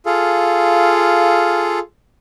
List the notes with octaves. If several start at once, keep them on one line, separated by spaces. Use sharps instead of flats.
F4 G#4 A4 F5